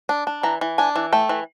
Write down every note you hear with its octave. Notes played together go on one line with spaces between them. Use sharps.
D4
D4
E3 A#5
E3
D4 G#5
E3
A3 G5
E3